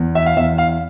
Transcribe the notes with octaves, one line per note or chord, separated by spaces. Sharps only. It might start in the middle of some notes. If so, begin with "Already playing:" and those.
Already playing: E2
E5
F5
E2 E5
F5